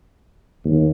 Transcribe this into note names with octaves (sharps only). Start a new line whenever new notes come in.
D#2